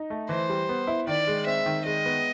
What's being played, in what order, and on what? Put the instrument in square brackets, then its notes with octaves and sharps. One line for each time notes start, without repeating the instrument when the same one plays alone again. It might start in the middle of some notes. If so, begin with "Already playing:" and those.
Already playing: [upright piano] D#4
A3
[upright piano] E3 [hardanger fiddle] C5
[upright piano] G3
B3
E4
[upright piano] D#3 [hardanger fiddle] D5
[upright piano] G#3
[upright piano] C4 [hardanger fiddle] E5
[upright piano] D#3
[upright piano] G#3 [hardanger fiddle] D#5
[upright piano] B3